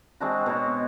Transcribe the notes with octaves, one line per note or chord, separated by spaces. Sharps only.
G#3 C4 D4 F#4
B2 C5 C#5